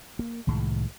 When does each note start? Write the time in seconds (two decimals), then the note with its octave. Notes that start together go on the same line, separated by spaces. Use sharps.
0.19 A#3
0.47 C2 A2 D#3 G#3